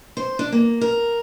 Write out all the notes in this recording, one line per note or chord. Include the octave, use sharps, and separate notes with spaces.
C5
D4
A#3
A#4